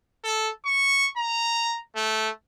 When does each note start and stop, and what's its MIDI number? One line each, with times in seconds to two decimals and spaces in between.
0.24 0.50 69
0.66 1.07 85
1.17 1.79 82
1.96 2.29 57